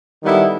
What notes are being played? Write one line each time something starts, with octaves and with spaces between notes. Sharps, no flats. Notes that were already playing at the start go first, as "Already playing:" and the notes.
D#3 G3 B3 E4 A4